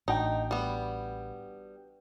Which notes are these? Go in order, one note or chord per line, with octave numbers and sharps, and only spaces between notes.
A1 D4 D#4 F#4 G5
G3 B3